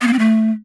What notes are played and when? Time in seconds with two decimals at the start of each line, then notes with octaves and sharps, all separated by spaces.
0.02 B3
0.07 A#3
0.13 C4
0.19 A3